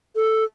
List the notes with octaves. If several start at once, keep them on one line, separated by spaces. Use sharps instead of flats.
A4